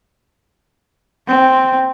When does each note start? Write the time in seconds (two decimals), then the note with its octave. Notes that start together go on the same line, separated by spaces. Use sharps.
1.28 C4